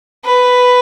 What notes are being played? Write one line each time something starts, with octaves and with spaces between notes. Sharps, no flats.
B4